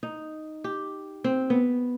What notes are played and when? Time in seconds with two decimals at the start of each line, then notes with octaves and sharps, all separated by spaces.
0.03 D#4
0.64 G4
1.24 C4
1.50 B3